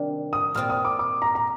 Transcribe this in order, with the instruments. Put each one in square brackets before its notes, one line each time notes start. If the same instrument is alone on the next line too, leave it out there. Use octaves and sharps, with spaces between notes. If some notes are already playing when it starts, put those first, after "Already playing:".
Already playing: [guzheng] C3 D#3 G3 D4
[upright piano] D#6
[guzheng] A#2 G3 C4 F4 [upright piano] F6
[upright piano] D#6
D6
D6
A#5
A#5